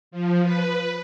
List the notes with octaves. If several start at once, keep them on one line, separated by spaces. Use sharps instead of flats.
F3
B4